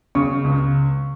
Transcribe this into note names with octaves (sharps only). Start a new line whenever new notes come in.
C#3 C#6
C#2